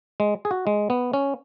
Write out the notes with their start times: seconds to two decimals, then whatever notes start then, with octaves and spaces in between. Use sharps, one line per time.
0.20 G#3
0.45 G#4
0.51 F#4
0.67 G#3
0.90 B3
1.13 C#4